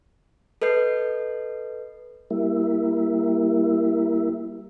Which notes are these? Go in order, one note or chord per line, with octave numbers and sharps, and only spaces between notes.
A4 B4 D#5 G6 C7
G3 A#3 E4